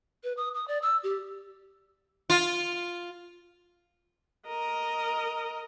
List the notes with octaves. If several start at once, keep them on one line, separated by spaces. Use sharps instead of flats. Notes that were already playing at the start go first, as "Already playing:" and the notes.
B4
D#6
D#6
D5
E6
G4
F4
A#4 D#5